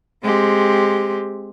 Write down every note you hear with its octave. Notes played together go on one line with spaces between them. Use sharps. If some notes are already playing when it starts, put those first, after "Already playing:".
G#3 C4 G4